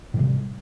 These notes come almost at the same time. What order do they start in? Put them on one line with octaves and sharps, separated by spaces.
A2 F3 C3 G3